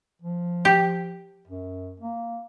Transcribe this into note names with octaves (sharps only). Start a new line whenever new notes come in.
F3
G4
F#2
A#3